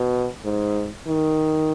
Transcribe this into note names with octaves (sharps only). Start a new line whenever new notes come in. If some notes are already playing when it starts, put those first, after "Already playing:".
Already playing: B2
G#2
D#3